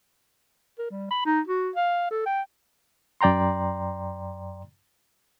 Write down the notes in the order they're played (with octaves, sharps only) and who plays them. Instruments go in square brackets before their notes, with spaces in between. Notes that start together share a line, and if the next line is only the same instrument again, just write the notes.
[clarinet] A#4
G3
B5
D#4
F#4
F5
A4
G5
[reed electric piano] F#2 D5 G5 A#5 C6